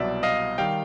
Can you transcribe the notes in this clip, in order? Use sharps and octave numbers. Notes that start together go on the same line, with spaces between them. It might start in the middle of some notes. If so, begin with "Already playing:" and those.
Already playing: C2 B2 F#3 D5 E5
D#5 F5
D#3 G3 F5 G5